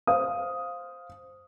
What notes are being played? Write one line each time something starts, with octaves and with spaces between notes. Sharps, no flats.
C5 F5 D#6